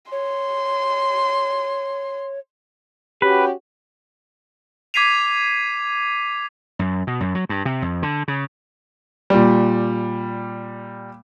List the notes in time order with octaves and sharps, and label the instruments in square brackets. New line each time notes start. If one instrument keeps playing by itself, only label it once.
[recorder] C#5 [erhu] C6
[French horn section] C#4 F#4 G4 [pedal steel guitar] B4
[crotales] D6 G#6 B6 C7 D#7 F7
[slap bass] F#2
B2
F#2
F#3
G2
C3
F2
D3
C#3
[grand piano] A#2 G3